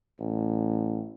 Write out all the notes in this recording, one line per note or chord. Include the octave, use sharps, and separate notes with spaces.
A1